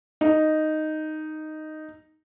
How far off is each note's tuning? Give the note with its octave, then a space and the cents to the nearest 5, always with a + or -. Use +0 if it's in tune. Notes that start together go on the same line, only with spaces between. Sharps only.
D#4 -5